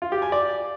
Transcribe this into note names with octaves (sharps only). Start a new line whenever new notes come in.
F4
G4
G#5
D5